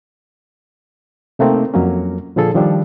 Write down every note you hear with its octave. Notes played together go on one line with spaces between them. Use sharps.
C3 A3 A#3 C4 D#4
F2 F#3 A#3 C#4
A#2 D3 F3 G#4 A4
D#3 F3 G3 D4